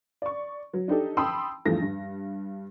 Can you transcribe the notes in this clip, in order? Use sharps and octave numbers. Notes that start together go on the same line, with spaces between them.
D5 C#6
F#3
D4 D#4 G4 A4
G5 A5 B5 C6 D#6 E6
E2 G2 F3 A3 A#6
G2